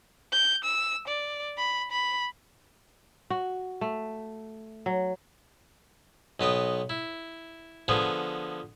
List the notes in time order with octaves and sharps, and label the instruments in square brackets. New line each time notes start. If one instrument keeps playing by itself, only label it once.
[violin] G6
E6
D5
B5
B5
[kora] F#4
A3
F#3
[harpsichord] B1 B3 D#5 G5
E4
D3 F3 B3 G#4